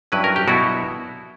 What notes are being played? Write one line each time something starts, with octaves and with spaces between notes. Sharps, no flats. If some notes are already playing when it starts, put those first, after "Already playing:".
G2 F#3 C#4 E4 B4
A#4
G4
B2 F#3 B3 E4 F#4